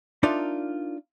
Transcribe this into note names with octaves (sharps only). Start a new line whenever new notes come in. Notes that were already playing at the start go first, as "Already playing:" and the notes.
D4 D#4 F4 A#4 D5 E5